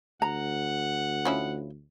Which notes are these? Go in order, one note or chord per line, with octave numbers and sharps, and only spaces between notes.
D2 F#5 A#5
F3 C#4 E4